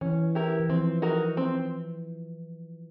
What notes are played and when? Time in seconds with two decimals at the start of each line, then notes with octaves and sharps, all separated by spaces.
0.01 E3 C#4
0.35 E4 G4 A#4
0.60 E3
0.69 F3 C4
1.02 D#4 F#4 A#4
1.37 C4